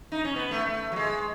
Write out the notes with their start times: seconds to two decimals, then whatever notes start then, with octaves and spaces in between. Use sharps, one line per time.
0.12 D#4
0.24 C#4
0.36 B3
0.51 A3
0.66 A3
0.92 F#3
0.96 G#3